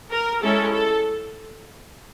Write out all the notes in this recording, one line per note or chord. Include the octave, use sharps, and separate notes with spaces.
A#4
G#3 C#4 E4 A4
A4